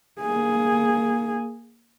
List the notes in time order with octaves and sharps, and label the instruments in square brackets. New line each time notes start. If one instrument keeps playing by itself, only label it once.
[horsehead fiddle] A#3 G#4